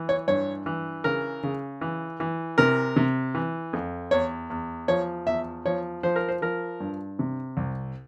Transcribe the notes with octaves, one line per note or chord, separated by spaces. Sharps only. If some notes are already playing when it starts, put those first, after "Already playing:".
Already playing: E3
C#5
G2 C#5
E3
C#3 A#4
C#3
E3
E3
C3 A#4
C3
E3
F2
E2 C#5
E2
F3 C#5
E2 E5
F3 C#5
F3 C5
A#4
C5
F3 A#4
G2
C3
C2